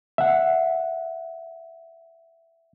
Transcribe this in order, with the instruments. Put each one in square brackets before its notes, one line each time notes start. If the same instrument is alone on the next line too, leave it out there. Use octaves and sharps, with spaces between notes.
[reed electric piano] E5 F#5